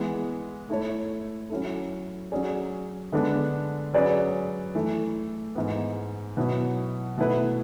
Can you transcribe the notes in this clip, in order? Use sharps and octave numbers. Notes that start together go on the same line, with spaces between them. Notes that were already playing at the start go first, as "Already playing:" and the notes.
Already playing: E3 G#3 B3
A3 E4 A4 C#5
F#3 C#4 E4 A4
F#3 C#4 G#4 D5
D3 G#3 B3 D4 A4
F#3 C#4 G#4 B4 D5
E3 A3 E4
G#2 E3 B3
B2 F#3 B3 E4
B2 A3 E4 B4